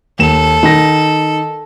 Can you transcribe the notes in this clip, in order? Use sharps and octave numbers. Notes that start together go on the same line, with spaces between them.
D#2 A4 E7
D#3 A#6